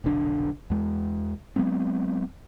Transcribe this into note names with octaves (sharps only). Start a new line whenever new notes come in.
F1 B1 D3 D4
E2 G#3
F#3 G#3 B3 C4